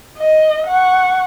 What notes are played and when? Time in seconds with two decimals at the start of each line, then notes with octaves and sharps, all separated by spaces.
0.18 D#5
0.67 F#5 C#6